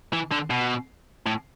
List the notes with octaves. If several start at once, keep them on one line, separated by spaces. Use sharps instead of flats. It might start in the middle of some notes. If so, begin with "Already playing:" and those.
E3
D3
B2
A2